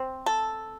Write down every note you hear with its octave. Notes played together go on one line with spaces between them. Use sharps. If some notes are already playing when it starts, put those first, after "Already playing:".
Already playing: C4
A4